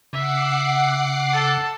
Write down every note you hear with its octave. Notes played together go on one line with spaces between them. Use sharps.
C#3 E5 F#5 D6 C7
A4 A5